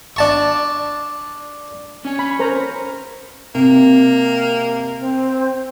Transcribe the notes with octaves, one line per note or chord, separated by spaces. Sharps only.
D4 A5 C#6
C#4
B5
A#4 C5 A#5
C3 A#3
C4